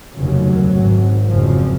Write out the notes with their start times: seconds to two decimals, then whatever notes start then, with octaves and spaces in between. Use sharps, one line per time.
0.16 F1 D#2 C#3 F#3
0.73 G#1 G#2
1.31 F#1 F2 C#3 F3